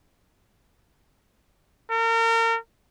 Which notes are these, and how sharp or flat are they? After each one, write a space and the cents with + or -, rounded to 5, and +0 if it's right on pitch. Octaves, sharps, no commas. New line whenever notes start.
A#4 -35